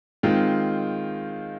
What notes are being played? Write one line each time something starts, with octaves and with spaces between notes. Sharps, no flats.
D#3 G#3 C4 F4